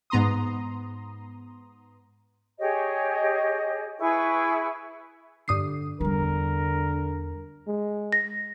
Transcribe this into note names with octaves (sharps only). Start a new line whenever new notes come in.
G#2 B3 A#5 C6 D#6
G4 G#4 C#5 D#5
E4 G#4 B4 C#6
G2 D3 D#6 C7
E2 D3 G3 A#4
G#3
A#6